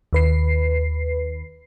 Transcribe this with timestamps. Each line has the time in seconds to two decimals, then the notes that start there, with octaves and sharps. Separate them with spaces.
0.13 D#2 B4 C7